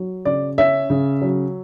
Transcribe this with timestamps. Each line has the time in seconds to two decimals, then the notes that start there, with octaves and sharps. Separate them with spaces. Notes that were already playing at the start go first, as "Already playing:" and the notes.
Already playing: F#3
0.25 C#3 D5
0.58 C#4 E5
0.90 C#3
1.22 F#3